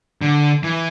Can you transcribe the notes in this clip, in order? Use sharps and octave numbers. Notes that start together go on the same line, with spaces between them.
D3
E3